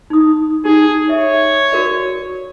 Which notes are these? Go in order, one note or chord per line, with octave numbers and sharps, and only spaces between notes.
D#4 D#6
D#4 G4 G#4
C#5 E5
F#4 A#4 D5